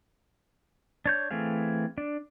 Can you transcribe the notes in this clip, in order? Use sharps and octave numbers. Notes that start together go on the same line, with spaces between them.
D4 C#5 G6
E3 A3 C4 G#4 F5
D4